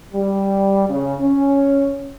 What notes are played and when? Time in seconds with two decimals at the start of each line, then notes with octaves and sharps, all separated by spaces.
0.14 G3
0.90 C#3
1.20 C#4